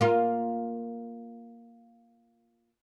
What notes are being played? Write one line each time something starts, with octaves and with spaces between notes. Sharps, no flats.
A#3 F4